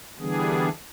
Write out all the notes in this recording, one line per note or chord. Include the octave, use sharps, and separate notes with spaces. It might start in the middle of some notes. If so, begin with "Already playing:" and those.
D3 E3 G3 B3 D4 G#4